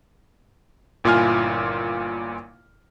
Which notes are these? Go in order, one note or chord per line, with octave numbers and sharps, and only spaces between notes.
G1 A#2 E4 F4 G#5 F6